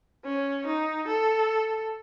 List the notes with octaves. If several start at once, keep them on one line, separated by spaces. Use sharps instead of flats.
C#4
D#4
A4